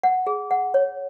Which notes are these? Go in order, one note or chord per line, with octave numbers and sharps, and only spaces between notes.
F#5
G#4
F#5
C#5